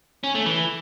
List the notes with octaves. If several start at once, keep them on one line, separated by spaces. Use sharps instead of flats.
C#4
A3
E3